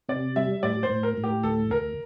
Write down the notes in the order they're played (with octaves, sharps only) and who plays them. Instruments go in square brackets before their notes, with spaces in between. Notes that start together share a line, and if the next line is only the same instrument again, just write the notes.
[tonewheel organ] C3 [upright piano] D5
[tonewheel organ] G3 [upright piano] E5
[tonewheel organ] A2 [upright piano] D5
[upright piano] C5
[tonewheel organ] A2
[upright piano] A#4
[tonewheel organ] A2
[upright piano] G4
[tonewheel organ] D2 [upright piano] A4
[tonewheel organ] D2 [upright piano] A#4